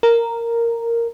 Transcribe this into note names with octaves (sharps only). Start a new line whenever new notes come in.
A#4